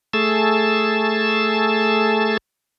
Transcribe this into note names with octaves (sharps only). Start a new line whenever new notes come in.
A3 G#4 A5 E6